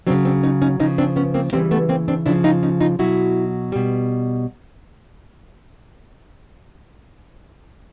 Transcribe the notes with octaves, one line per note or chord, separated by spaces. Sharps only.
C#3 F#3 C4 D4
C4 D4
C#4 D#4
C#4 D#4
C#3 F3 C#4 D#4
C4 D4
B3 C#4
A#3 C4
C#3 E3 G3 A#3 C4
A3 B3
A#3 C4
C4 D4
C#3 F3 D4 E4
D#4 F4
C#4 D#4
D#4 F4
B2 F#3 E4 F#4
B2 G3